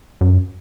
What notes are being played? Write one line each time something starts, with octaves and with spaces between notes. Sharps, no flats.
F#2